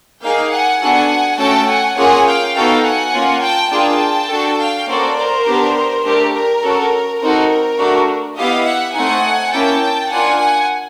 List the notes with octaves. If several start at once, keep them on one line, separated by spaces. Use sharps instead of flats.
A#3 D#4 G#4 F5 G5
F#5 G#5
B3 D4 F#4 A4 F#5 G#5
A3 C#4 F#4 A4 G5 A5
F#5 G#5
A#3 C#4 F4 G#4 F#5 G#5
F5 G5
B3 D#4 F#4 A4 F5 G5
F#5 G#5
A#3 C#4 F4
G5 A5
A#3 D4 F4 G#4 G5 A5
D4 F#4 A4
F5 G5
A#3 C#4 F#4 A4 C5 D5
A#4 C5
B3 D4 G4
A3 D4 G4 A#4
A#4
C#4 F#4 A4
C4 D#4 F#4 A4 A#4
A3 D4 F#4
B3 E4 G4 D#5 F5
E5 F#5
A3 C4 D#4 F#5 G#5
A#3 C#4 E4 G5 A5
A#3 D4 F4 F#5 G#5
F#5 G#5